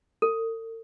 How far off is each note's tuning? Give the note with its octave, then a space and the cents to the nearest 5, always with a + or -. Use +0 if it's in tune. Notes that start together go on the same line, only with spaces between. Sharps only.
A4 +45